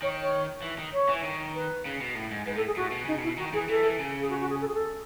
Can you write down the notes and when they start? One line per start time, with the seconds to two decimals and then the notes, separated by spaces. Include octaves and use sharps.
0.02 D#3 C#5
0.21 C#5
0.62 E3
0.78 D#3
0.93 C#5
1.09 E3
1.23 D#3
1.54 B4
1.85 C#3
2.01 B2
2.15 A2
2.31 G#2
2.46 G#2 B4
2.56 A2 A4
2.66 G#4
2.76 A2 F#4
2.92 B2
3.05 C#3 D#4
3.18 B2 E4
3.38 D#3 F#4
3.53 E3 G#4
3.69 E3 A4
3.83 E3
3.99 C#3
4.20 G#4
4.29 F#4
4.40 F#4
4.49 G#4
4.60 A4
4.67 G#4
4.74 A4